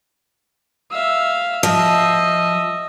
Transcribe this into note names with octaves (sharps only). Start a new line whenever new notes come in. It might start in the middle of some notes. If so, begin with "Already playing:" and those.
E5 F5
F3 D#5 E5